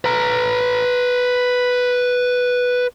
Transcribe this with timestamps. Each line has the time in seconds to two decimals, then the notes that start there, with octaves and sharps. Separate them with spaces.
0.05 B4 A#5